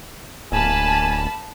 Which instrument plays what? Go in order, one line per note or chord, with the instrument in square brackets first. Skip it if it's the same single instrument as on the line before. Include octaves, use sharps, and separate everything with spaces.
[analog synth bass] D1 [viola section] A#3 A5 B5 [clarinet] G#5